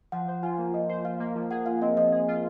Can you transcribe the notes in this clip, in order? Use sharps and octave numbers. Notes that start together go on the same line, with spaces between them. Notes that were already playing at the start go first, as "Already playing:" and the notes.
F3 F#5
C5
F4 G#5
A#3
F3 D#5
C5
F4 F5
A#3
F3
G#4 F#5
F4 F5
C4 D#5
F3 D#5
G#4
F4